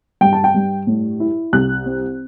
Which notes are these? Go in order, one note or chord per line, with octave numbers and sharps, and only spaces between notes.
G2 G5
A5
G5
G2
A2
E4
C2 F#6
C4